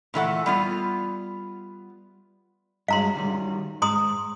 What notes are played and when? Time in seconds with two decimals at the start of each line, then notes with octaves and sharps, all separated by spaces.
0.14 A#2 E3 A3 F#5
0.46 G3 B3 F4
2.88 G2 F#3 G#3 F5 A#5 C6
3.16 D#3 F#3 G3
3.82 G#2 A#5 C6 D#6